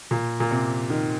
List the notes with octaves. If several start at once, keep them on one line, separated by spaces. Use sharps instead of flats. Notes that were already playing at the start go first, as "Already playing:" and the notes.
A#2
A#2
C3
D#3